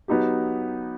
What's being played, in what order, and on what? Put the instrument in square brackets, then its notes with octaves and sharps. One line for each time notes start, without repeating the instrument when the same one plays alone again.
[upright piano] F#3 B3 D#4 G4